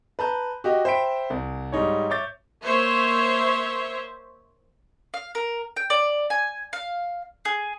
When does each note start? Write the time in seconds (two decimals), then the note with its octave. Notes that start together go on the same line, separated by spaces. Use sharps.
0.19 B4 A5 A#5 G6
0.64 F#4 G4 D#5
0.85 C5 E5 G5 B5 B6 D7
1.30 C2
1.72 G#2 G3 D#4 C#5
2.10 C#5 E5 D6 G6 A6
2.64 A#3 C5 C#5 E5
5.14 F5
5.35 A#4
5.77 G5
5.90 D5
6.30 G#5
6.73 F5
7.45 G#4